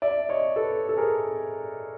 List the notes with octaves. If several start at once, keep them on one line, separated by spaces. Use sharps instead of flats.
D5 E5
C#5 D#5
A4 B4
A4
G#4 A#4